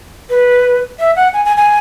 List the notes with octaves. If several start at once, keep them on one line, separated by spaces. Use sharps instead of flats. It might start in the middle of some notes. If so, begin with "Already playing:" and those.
B4
E5
F#5
G#5
G#5
G#5